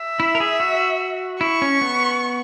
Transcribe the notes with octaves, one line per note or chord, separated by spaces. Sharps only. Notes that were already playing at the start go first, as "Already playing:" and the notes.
Already playing: E5
E4
A#4
G#4
F#4
E4 C#6
C#4
B3